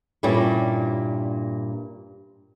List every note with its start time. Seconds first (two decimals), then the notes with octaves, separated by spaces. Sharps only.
0.23 G2 A#2 G3 C#4 D4 E4